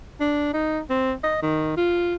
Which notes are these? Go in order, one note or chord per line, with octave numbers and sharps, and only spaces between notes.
D4
D#4
C4
D#5
D#3
F4